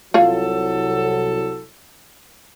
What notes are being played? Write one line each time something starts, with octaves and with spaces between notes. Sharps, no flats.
C2 F#3 F4 A4 C#5 F5